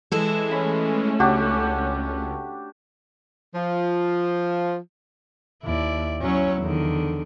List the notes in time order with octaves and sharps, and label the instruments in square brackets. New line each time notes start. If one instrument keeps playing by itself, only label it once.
[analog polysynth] E3 G#3 [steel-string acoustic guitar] E4 A4
[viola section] A3 C#4 [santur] B5
[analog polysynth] C#2 [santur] D4 F#4 G4
[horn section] F3
[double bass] D#2 [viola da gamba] E4 D5
[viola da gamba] F#3 C#5 [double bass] C#4 E4
[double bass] E2 [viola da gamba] D3 D#3